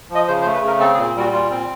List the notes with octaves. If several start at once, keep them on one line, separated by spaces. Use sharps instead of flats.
F3
D#5
C#3 C5
C5
A3
B4
C#3 A#4
C4 A4
G#4
A#2
G3 F#4
A#2 F4
C4